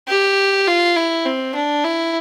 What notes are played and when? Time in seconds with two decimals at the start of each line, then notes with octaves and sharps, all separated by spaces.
0.08 G4
0.67 F4
0.96 E4
1.25 C4
1.55 D4
1.84 E4